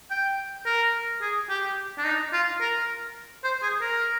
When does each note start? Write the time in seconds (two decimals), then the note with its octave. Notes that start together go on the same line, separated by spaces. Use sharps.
0.10 G5
0.66 A#4
1.21 G#4
1.50 G4
1.98 D4
2.05 D#4
2.33 F4
2.60 A#4
3.44 C5
3.62 G#4
3.81 A#4